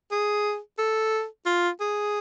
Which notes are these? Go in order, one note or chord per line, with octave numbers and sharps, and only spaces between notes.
G#4
A4
F4
G#4